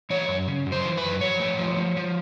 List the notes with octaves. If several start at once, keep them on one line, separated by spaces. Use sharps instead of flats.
E3 C#5
F#2
C#3
F#2
C5
E3
B4
F#2
F3 C#5
A3
F3
F3
F3